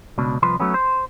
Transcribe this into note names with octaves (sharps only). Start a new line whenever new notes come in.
C#2 B2 D4
C2 F3 B4 C6
F#3 A3 B3 C#4
C5